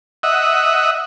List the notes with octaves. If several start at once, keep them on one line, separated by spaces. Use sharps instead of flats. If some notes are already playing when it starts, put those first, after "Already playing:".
D#5 E5 F#5